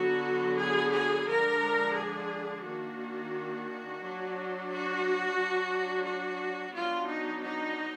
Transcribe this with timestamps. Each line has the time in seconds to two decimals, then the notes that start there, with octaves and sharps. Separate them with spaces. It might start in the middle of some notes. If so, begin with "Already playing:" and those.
Already playing: D3 F#3 B3 F#4
0.59 G#4
0.93 G#4
1.27 D3 F3 G#3 D4 A#4
1.95 G#4
2.64 D#3 A#3 D4 F#4
4.01 F#3 D4
4.69 F#4
5.38 F#3 D4
6.06 F#4
6.74 F#3 B3 D4 F4
7.08 D#4
7.43 D#4